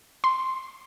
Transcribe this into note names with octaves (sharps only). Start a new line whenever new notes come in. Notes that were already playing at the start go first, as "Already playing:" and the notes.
C6